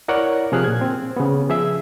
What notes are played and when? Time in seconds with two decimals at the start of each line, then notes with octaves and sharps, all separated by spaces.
0.08 E4 A#4 C#5 D5 F#5
0.52 C3 F3 G#4 F6 F#6
0.64 A#2 G#6
0.81 C4
1.17 C#3 B3
1.49 F3 G#4 E5 E6